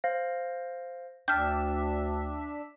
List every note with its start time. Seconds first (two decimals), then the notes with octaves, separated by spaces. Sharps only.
0.04 C5 F5 A#6
1.28 D2 D4 E5 G5 F6 G6 B6